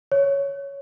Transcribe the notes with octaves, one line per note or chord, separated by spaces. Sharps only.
C#5